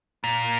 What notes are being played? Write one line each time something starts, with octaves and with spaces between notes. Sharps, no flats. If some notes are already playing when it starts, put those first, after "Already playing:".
A#2